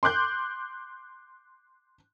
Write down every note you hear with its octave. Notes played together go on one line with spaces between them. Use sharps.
C6 D6 F#6 G6